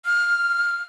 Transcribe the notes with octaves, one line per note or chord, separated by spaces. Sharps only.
F6